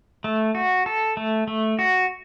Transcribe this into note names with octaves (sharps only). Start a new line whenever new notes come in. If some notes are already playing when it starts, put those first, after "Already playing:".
A3
F#4
A4
A3
A3
F#4